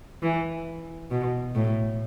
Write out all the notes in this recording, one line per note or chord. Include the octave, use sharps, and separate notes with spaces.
E3
B2
A2